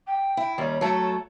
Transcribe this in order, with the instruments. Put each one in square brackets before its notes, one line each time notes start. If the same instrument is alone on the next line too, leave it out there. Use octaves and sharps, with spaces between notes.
[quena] G5
[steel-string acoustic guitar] E4
D#2 G3 C#4
[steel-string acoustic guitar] F#3 A3 A4 [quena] A5